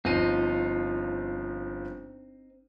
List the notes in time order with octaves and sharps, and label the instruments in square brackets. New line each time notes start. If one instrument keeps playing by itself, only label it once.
[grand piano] G1 F3 D#7 [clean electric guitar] C4 D#4